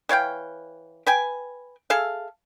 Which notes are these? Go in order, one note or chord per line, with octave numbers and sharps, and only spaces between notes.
E3 C#5 F5 G5
B4 G5 G#5
G#4 A4 E5 F5